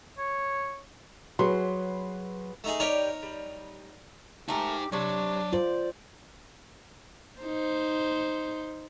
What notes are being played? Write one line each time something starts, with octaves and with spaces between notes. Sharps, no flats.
C#5
F#3 G#4 B4 C6
A3 D#4 G#4
D#4 G4 A#4 B4 C#5 D5
G3
A3 D#4 G4 A#4 G#5
C3 F#3 D4 C#5
F4 C5 D5
D#4 C5